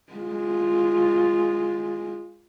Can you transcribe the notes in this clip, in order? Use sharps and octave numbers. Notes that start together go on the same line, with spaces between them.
G#3 F4